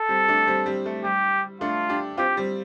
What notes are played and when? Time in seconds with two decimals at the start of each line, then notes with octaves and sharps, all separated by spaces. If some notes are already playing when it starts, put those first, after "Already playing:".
Already playing: A4
0.09 G3 C4
0.28 A3 D4
0.47 G3 C4
0.66 G3 C4
0.86 A3
1.04 G3 G4
1.61 A3 D4 F4
1.89 D4 G4
2.18 C4 F4 G4
2.37 G3 C4